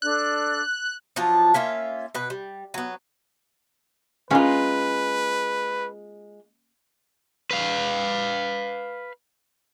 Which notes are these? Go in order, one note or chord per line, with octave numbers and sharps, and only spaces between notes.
D4 A4 D5 F#6
F3 F#3 D4 F4
A#3 C#4 F4 E5
B2 B4
G3
F#3 B3
G#3 A#3 C#4 F4 B4
B4 F5